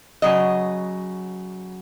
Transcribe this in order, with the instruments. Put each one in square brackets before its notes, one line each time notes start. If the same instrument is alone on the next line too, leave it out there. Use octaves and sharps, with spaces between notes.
[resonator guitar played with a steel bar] C#3 F#3 D#5